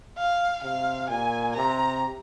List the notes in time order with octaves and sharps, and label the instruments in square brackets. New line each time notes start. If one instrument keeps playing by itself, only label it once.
[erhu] F5
[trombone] C3 [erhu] F5
[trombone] A#2 [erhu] G#5
[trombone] C3 [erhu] A#5